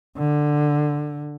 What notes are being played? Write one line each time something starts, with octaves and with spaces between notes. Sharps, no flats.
D3